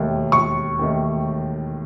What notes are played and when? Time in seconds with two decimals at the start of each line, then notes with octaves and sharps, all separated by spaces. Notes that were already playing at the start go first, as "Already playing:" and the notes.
Already playing: E1 D#2 D#3 A3
0.32 E1 C#6
0.79 D#2 D#3 A3